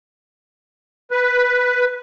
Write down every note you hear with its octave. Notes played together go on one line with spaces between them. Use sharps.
B4